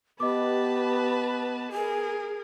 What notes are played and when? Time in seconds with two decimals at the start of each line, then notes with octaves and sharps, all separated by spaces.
0.20 B3 G4 B4 D#5 A5 D6
1.72 G#4 A#4 G#5